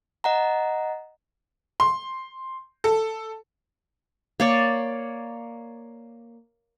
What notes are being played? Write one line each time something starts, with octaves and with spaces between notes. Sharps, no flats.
D#5 F#5 A#5
C6
A4
A#3 C#5 D5